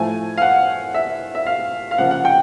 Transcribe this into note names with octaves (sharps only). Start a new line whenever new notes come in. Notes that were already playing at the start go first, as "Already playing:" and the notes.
Already playing: A2 F3 A3 G#5
F5
F#5
E5
E5
F5
F5
C#3 F3 A#3 F#5
F#5
G5